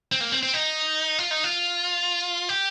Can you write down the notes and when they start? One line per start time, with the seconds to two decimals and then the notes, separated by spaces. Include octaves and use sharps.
0.12 C4
0.21 A#3
0.32 C4
0.43 C4
0.54 D#4
1.19 F4
1.31 D#4
1.44 F4
2.49 G4